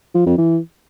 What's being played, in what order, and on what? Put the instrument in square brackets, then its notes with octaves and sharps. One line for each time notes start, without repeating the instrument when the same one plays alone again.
[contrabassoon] F3
F2
E3